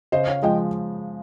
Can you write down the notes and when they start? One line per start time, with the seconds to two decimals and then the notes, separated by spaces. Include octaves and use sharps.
0.12 C#3 C5 D#5
0.28 C#5 F5
0.42 F3 G#3 D#5 G5